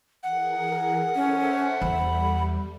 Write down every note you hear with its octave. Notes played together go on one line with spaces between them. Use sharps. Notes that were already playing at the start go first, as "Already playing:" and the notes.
E3 G#4 A#4 F#5
C#4 A4 C5 E5
E2 G3 B5